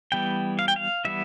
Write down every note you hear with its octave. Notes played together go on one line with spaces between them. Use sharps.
E3 G3 B3 G5
F5
G5
F5
E3 G3 B3 E5